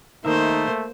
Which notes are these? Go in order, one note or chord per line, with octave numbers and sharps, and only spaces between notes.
D#3 A3 A#3 D#4 C5 E5